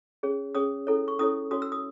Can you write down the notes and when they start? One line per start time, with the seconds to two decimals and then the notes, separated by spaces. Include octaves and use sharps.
0.23 C#4 G#4 C#5
0.55 C#4 G#4 C#5 D#6
0.87 C#4 E4 A4 C#5
1.08 C#6
1.19 C#4 E4 A4 C#5 D#6
1.51 C#4 F#4 C#5 D#6
1.62 E6
1.72 D#6